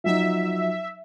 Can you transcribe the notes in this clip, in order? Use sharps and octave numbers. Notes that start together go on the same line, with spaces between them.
F3 F#3 D#4 E5